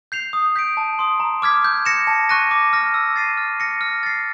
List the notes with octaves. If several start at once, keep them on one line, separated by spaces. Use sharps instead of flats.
G6 C7 F7
D#6
G6 B6 D7
A5
C6 D#6
A#5
D6 F6 G#6 B6
G6
A#6 C#7 E7
A5
C#6 F#6 A#6 D#7
D6
F6 A#6
E6
A6 C7 D#7
F6
A#6 C#7
F6
A6 C7